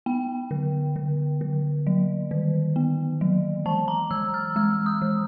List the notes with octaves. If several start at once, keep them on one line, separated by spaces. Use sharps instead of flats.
B3 G5
D3
D3
D3
F#3
D#3
B3
F#3
E3 A5
A#5
E3 E6
F6
G#3 E6
D#6
E3